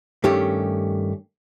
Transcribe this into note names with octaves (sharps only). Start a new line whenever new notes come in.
G2 D#3 A3 C#4 G4